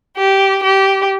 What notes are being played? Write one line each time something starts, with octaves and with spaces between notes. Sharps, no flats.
G4
G4